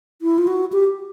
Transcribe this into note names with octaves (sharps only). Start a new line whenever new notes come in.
E4
F4
F#4
G4